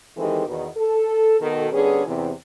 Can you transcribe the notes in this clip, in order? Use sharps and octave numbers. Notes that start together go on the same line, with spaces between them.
D#3 E3 G#3 C4 G4 A4
E2 B2 D#3
A4
B2 D#3 A4
D3 G3 B3 C#4 G#4
E2 C3